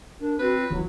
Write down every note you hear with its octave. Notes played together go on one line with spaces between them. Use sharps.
D4 A#4
C4 F#4 B4
F4
E3 F#3 E4